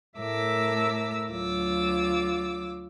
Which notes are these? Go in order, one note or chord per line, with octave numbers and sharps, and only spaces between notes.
A2 A3 A#4 E5 D6 E6
D2 F#3 F4 D6 E6